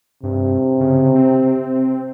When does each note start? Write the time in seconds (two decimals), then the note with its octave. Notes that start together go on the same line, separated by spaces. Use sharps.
0.23 G2 C3
0.80 C#3
1.15 C4